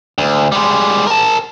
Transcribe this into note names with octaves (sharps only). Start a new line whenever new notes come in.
D2
G3 G#3
A#4 A5